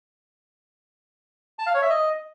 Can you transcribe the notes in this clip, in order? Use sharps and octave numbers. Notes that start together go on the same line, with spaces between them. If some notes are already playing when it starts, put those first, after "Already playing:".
A5
F5
C#5
E5
D#5